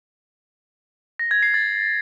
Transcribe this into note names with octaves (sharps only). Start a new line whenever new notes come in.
A#6
G#6
C7
A6